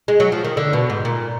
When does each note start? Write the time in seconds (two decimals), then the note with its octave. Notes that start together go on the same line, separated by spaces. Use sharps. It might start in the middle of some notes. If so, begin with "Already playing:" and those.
0.08 G#3
0.20 F#3
0.32 F3
0.44 D#3
0.57 D3
0.73 B2
0.90 G#2
1.05 A#2